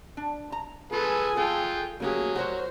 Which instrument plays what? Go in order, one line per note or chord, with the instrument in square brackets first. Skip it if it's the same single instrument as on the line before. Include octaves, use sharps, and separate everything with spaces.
[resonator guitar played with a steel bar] D4
A#5
[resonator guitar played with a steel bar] F4 [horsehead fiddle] G#4 G#5 [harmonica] A4 B4
[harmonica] F4 G5 [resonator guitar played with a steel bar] A4
[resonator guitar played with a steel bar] C#3 A#3 G4 [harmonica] F#3 [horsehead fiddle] A3 G#4
[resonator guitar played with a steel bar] F#4 A#4 C#5 [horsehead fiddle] C5